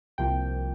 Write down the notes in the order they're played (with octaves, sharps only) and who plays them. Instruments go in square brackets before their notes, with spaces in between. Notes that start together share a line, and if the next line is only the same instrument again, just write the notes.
[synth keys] C2 C3 F3 A#3 G5